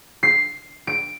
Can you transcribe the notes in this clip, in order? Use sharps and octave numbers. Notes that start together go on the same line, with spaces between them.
C7
D7